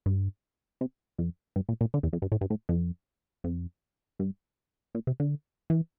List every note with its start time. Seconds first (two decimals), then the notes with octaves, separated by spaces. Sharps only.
0.06 G2
0.81 C3
1.18 F2
1.56 G2
1.69 A#2
1.81 A#2
1.94 D3
2.03 E2
2.13 F2
2.22 G2
2.32 A2
2.41 G2
2.50 A2
2.69 F2
3.44 F2
4.19 G2
4.95 A#2
5.07 C3
5.20 D3
5.70 E3